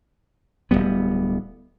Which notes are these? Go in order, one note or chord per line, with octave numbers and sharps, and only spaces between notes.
D1 D#2 G3 B3